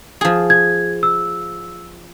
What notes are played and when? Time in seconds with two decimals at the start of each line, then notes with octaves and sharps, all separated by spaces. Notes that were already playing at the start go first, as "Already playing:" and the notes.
0.21 F3 G#4
0.50 G#6
1.03 E6